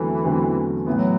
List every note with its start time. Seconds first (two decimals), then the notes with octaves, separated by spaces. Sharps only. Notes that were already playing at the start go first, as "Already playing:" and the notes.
Already playing: E2 D3 E3 F#3 A3 C4
0.24 E2 D3 F#3 A3 C4
0.86 A2 E3 F#3 B3